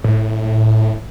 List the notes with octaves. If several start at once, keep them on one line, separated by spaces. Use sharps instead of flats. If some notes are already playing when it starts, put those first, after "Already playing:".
A2